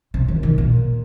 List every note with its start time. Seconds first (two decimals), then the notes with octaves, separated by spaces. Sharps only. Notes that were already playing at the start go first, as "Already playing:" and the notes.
0.14 C3
0.28 D#3
0.43 D#3
0.58 A#2